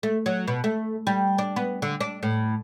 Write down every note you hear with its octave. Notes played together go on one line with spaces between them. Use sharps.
A3
F#3
B2
A3
G3
D4
B3
D3
D4
A2